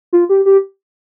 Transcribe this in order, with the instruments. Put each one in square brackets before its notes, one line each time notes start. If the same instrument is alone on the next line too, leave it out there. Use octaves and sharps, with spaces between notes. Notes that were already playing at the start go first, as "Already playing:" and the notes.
[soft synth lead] F4
G4
G4